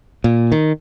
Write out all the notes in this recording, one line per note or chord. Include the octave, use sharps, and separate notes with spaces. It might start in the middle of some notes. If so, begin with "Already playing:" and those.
A#2
D#3